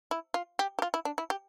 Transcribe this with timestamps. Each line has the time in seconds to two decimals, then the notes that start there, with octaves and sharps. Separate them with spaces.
0.11 E4
0.34 F4
0.59 G4
0.79 G4
0.82 F4
0.94 E4
1.05 D4
1.18 E4
1.30 G4